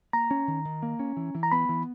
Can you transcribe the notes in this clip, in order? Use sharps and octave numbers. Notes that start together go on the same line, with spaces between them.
A#3 A#5
C#4
D#3
D#3
A#3
C#4
E3
E3
A#5
B3 B5
E3